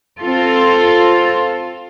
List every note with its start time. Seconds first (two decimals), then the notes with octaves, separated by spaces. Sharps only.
0.19 C4 F4 A4